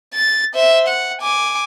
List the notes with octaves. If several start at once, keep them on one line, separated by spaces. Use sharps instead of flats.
A6
C5 E5
F#5
G#5 D6